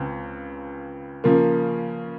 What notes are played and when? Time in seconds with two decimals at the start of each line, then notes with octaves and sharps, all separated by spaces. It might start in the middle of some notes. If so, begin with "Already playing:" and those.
Already playing: C#2 C#3 C4
1.24 C#3 F3 A#3